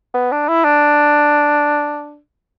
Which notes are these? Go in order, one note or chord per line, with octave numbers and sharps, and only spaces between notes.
B3
D4
E4
D4